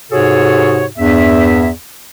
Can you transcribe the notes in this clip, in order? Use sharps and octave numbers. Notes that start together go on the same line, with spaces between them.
G#2 C3 F#4 G#4 A4 C#5
E2 G2 E5